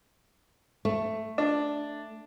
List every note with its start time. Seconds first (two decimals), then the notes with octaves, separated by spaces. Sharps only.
0.85 A3
1.38 D4